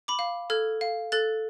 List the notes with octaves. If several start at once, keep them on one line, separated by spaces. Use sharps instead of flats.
B5 D6
F5
A4 F6 G#6
F5
A4 F#6 A6